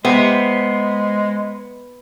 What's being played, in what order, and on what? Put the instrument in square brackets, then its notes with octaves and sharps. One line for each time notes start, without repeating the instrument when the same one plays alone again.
[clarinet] G#3 [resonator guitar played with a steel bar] B3 [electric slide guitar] C5 E5